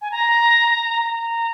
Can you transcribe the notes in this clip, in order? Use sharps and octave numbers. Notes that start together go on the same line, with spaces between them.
G#5
A#5
A#5